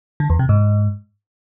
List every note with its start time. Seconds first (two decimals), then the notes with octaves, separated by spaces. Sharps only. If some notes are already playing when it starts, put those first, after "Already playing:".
0.20 D3
0.30 E2
0.39 C3
0.49 G#2